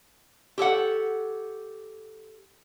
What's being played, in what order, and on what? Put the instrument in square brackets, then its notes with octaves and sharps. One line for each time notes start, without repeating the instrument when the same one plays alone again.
[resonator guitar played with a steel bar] G4 A4 C#5 F#5